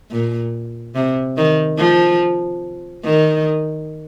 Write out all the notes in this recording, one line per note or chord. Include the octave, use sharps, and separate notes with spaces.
A#2
C3
D#3
F3
D#3